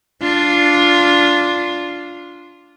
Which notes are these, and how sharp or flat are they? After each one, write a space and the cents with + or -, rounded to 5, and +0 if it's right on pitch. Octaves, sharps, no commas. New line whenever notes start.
D4 -10 F4 +0